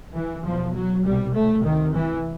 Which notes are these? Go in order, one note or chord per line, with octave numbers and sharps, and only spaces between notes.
E3
E2 B2 F3
F#3
C2 B2 G3
A3
D2 C3 D#3
E3